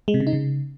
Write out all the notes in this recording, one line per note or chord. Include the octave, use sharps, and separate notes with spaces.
G#3
C3
C#3
D#4
C#3